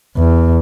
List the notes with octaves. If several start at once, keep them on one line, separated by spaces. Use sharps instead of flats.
E2